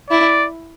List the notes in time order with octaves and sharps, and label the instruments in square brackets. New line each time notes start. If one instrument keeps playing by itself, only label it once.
[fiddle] E4 [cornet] D5